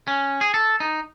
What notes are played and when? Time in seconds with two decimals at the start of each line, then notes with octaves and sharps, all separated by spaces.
0.08 C#4
0.41 G#4
0.54 A4
0.80 D#4